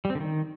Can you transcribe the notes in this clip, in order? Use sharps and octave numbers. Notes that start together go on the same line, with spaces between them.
G3
C4
D3
D#3